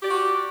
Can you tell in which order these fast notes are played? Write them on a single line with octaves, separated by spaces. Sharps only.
G4 D5 F#4